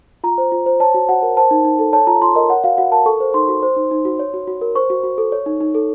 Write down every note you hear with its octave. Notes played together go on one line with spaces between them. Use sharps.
F4 A#5
C5
F4
C5
C#5 A5
F#4
F#4 F#5
A#4
C5 A5
D#4
D#4
A4
C#5 A5
F4 A#5
F4 C6
A#4 D#5
C#5 F#5
F#4 F5
F#4 F#5
A#4 A5
A4 C#6
C5
D#4 C6
F#4
C5
D#4
D#4
F#4
C#5
F#4
F#4
A#4
C5 C#6
F#4
F#4
A4
C#5
D#4
D#4
A4